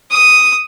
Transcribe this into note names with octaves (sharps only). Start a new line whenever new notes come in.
D#6